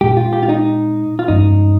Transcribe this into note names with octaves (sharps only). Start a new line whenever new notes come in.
A#2 G#3 C4 G4
F4
G4
F4
D#4
F4
G2 F3 G#3 C#4 D#4